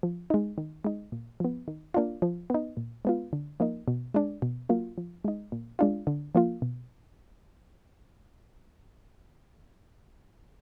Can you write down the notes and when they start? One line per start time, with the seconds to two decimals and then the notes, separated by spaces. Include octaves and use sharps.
0.03 F3
0.30 G#3 D#4
0.58 D#3
0.85 G#3 D#4
1.12 A#2
1.40 F3 B3
1.68 D#3
1.94 A#3 D4 F4
2.22 F3
2.50 B3 D#4
2.77 A#2
3.05 G#3 B3 F4
3.33 D3
3.60 F3 A#3 D#4
3.88 B2
4.14 G#3 D4
4.42 B2
4.69 F#3 A#3 F4
4.98 F3
5.24 G#3 D#4
5.52 A#2
5.79 G#3 D4 F4
6.07 D3
6.35 F3 A#3 F4
6.62 B2